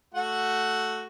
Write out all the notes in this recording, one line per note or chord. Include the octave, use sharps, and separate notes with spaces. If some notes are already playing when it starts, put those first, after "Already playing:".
A3 F#4 F#5